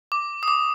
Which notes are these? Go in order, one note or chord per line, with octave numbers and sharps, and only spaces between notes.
D6
D#6
D6